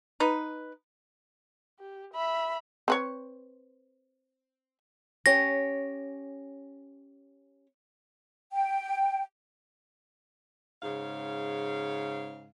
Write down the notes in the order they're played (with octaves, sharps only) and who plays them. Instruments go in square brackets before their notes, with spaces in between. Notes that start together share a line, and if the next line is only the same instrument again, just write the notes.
[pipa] D#4 B4
[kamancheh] G4
E5 B5
[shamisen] C4 B4 C#5
[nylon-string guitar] C#4 G4 C#5 [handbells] A#6
[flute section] G5
[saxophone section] G#2 C#3 F5